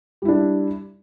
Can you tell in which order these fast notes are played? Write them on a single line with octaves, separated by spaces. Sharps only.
G3 E4 D4